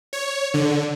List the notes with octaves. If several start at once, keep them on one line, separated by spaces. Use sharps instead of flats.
C#5
D3